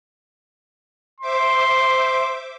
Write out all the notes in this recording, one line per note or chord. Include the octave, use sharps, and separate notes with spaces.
C5 E5 C6 D6